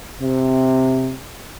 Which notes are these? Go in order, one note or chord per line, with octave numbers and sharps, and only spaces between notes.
C3